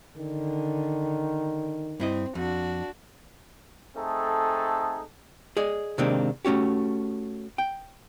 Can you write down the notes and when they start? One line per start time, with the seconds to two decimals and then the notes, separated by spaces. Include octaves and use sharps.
0.18 D3 D#3
2.00 G2 C4 E4 D#5
2.35 F2 D4 F#4
3.95 A3 C4 D#4 G#4 A4
5.57 G#4 D5 D#5
5.98 C3 D#3 G#3 A#3 C4 D4
6.45 A3 C#4 F#4 G4
7.58 G5